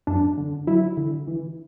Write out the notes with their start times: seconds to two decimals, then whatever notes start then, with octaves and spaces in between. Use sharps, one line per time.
0.07 F#2 D4
0.37 D3
0.67 F#3 E4
0.97 D3
1.27 E3